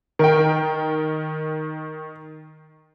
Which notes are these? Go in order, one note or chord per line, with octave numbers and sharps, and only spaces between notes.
D#3 A#4 G5